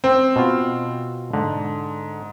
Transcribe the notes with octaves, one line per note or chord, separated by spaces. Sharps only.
C4
B2 F4
G#2 D3